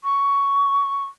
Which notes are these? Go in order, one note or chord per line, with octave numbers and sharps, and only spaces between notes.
C#6